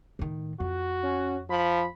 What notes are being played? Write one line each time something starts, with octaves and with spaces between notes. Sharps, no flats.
A2 D#3
F2 F#4
C#4
F3 B5